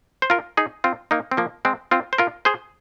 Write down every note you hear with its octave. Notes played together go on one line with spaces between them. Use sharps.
C5
F4 A#4
D#4 G#4
C4 F4
A#3 D#4
C4
F3 A#3
G#3 C4
C4 F4
C5
F4 A#4
G#4 C5